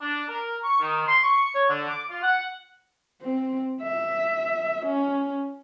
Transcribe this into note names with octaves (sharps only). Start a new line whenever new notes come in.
D4
A#4
C#6
D#3
C6
C#6
C#5
D3
D6
F4
F#5
C4
E5
C#4